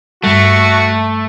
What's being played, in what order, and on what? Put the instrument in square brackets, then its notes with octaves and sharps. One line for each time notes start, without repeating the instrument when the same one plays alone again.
[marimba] G2 G3 [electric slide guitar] A3 [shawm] F#4